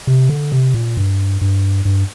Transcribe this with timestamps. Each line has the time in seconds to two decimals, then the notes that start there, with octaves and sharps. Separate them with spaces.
0.07 C3
0.29 D3
0.52 C3
0.74 A#2
0.97 G2
1.41 G2
1.85 G2